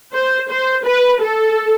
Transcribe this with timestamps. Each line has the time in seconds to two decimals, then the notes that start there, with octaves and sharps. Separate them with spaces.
0.13 C5
0.50 C5
0.85 B4
1.21 A4